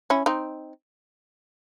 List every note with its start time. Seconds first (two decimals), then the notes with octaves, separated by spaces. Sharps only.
0.10 C#4 E4
0.26 C4 D#4